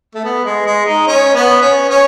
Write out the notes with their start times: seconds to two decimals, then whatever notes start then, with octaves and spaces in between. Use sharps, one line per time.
0.15 A3
0.24 B3
0.45 G#3
0.66 G#3
0.86 D#4
1.07 C#4
1.34 B3
1.62 C#4
1.89 C#4